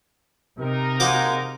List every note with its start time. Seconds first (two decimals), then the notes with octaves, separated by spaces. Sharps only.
0.59 C3 D#4 A#4
1.00 G#3 A#3 F#4 C5 D6